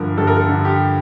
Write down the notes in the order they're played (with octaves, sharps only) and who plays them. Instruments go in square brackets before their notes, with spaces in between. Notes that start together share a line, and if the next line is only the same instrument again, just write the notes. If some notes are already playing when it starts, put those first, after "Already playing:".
Already playing: [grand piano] G2 D3 F3 A#4
G2 A4
A#4
A4
D3
G4